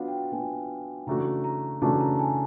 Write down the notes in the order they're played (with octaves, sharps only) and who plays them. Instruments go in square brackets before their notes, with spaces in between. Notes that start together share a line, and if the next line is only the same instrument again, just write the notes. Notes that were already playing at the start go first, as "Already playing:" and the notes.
Already playing: [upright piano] F#3 B3 D4 F4 [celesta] F5 F#5
[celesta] G5
[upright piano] F#3 B3 D4 F4 [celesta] G#5
[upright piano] C#3 E3 A3 D4 F#4 [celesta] A#5
[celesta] A#5
[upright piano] C#3 E3 A3 D4 F#4 [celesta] A5
[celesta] A#5
A5
G#5